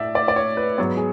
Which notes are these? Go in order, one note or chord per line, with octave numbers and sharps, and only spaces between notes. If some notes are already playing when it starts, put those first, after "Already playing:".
Already playing: A2 D5 E5
D5
D5
C#5
B4
G#2 F#3 B3 C#5
G#4